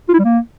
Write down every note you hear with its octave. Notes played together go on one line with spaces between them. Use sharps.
F4
E4
G3
A#3